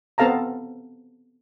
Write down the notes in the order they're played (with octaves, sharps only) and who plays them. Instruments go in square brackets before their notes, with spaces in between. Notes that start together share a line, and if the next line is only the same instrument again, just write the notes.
[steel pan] B3 C4 A4 F5 A5 A#5